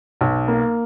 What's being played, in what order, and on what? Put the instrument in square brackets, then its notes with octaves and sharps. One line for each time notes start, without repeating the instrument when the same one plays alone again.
[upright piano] B1
A#3